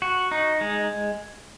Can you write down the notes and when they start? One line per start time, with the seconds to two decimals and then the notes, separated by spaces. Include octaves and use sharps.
0.02 F#4
0.31 D#4
0.61 G#3